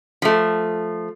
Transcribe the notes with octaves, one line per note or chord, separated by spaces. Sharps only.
F3 A3